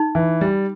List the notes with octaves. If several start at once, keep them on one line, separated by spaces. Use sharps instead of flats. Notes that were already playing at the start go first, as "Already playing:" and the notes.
Already playing: D#4
E3
G3